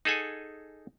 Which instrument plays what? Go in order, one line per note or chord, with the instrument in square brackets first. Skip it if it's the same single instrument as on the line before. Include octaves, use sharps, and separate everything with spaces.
[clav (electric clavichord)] D#4 G#4 A4 F#5 G#5